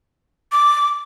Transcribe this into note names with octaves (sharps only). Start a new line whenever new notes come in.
D6